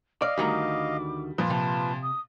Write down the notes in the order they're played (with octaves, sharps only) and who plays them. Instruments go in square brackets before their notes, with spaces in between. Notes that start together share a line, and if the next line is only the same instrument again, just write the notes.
[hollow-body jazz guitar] D5 [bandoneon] D#5 F5 [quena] F6
[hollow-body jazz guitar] D2 D#3 A#5 [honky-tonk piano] G3 [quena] D6
[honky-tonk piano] A#2 F3 [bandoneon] F4 B4
[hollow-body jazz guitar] C3 [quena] A5
[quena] D#6